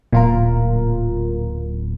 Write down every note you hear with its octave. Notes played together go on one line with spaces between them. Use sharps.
D1 A#2 F4 A#4